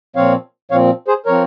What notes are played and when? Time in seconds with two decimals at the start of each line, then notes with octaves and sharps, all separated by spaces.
0.16 A#2 F3 C4 C#5 F5
0.71 A#2 F3 C4 C#5 F5
1.08 G#4 C5
1.26 F3 C4 A#4 C#5